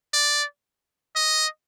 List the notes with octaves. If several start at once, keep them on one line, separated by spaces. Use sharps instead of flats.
D5
D#5